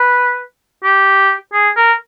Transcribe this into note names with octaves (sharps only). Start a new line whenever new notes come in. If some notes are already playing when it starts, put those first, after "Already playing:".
Already playing: B4
G4
G#4
A#4